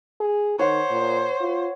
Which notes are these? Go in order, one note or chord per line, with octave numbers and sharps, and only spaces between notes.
G#4
D#3 C5 C#5 F#5
A#2
F4